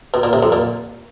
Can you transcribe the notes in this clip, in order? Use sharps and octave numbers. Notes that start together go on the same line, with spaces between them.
B2
A#2
C3
F2
A#2